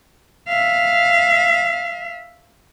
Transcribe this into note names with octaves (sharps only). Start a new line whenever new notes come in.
E5 F5